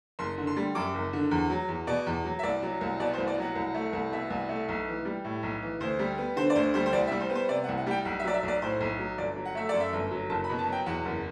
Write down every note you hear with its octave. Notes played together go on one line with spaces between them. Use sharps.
F#1 C6
D3
C6
G3
F#2 D6
F#1
D3
E2
F#3
E2
B2 D5
E2
F#3
E5
C2 D5
F#3
C2
B2 D5
C5
C2
D5
F#3 F#5
C2
A3
C2
B2 E5
C2
A3
B1
E3
G3
A2
B1
E3
D2 C5
G3
B3
D3 C5
D5
D2 C5
G3 C5
C5
C2 D5
E5
G3
C5
B3
C5
C3 D5
F#5
C2
F#5
G3 G5
B1 F#5
E5
F#3 D5
E5
B1 D5
A2 C5
B1
F#3
G1 D5
F#3
F#5
A3 E5
F#2 D5
E5
G1
F#3
F#1 A5
B5
B2
A5
F#3
G5
E2 F#5
F#1